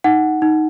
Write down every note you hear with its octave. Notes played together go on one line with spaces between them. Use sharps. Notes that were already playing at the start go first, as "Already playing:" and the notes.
D#4 F#5
D#4